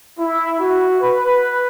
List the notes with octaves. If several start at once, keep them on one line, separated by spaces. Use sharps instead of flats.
E4
F#4
B4